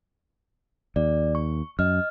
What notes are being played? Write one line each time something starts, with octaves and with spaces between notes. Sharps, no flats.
D#2 D5
C#6
F#2 D#5 F6